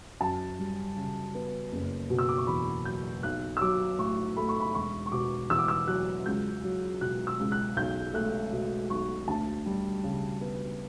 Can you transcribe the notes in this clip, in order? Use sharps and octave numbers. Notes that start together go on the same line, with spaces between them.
F#2 A5
G3
C#3
B3
F#1
B2
E6
D6
C#6
E2 B5
F#3 G6
B1 F#6
E6
F#3 D6
A2 C#6
A3 B5
C#6
B5
E1 C#6
C#6
B2 D6
E2 E6
D6
E6
F#3 F#6
C#2 G6
F#3
B2 F#6
E6
C#2
F#6
B1 G6
A3 F#6
B2
B1 C#6
D2 A5
G3
C#3
B3